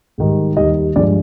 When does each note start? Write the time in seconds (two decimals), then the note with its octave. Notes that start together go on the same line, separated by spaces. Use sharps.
0.18 G#2 D#3 G3
0.57 D#2 D#3 G3 D#5
0.96 G2 F3 G#3 D5